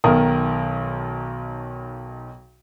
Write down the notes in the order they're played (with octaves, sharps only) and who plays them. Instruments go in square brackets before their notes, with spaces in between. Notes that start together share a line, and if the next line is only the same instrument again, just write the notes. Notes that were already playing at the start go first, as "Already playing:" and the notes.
[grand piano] B1 B2 D#3 A#4 D#6